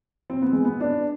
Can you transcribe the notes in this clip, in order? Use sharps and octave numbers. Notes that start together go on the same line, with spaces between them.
C4
B3
G#3
B3
D4